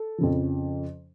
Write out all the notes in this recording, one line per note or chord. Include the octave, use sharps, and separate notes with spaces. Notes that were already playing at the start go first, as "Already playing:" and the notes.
Already playing: A4
F2 C#3 F3